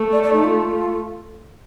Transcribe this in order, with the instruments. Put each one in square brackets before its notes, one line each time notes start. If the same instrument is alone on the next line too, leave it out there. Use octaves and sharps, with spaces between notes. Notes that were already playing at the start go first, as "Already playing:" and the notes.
Already playing: [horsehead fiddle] A3
[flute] D5
D5
D#4
F4